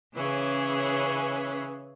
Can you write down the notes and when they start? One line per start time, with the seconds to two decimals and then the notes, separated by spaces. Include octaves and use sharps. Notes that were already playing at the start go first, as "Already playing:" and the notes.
0.15 C#3 E3 C#4 G#4